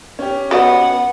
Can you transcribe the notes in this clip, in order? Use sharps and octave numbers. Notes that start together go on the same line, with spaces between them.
C#4 G4
B3 F#4 D5 D#5 F#5